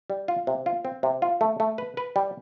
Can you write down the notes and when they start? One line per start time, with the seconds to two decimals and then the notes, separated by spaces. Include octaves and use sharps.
0.10 G3
0.28 F4
0.47 C3
0.66 F4
0.85 C4
1.03 C3
1.22 F4
1.41 A3
1.60 A3
1.78 B4
1.97 B4
2.16 G3